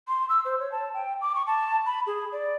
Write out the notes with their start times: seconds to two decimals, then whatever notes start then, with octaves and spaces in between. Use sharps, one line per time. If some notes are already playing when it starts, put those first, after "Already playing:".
0.08 C6
0.29 E6
0.45 C5
0.59 C#5
0.72 A5
0.94 G5
1.21 D6
1.35 C#6
1.47 A5
1.86 B5
2.07 G#4
2.32 D5